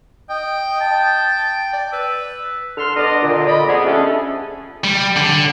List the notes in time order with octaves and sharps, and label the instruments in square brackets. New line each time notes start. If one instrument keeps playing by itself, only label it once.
[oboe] D#5 [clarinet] G5
[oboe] A5
[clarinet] D5
[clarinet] B4 [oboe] E6
[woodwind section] D3 A4 C6 F6
B3 D4 D5 D#5
A#2 D3
D5 D#5 B5
F2 B3 G#4
G3 A3 C#4 D4 G#4 A4
[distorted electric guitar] G3
D3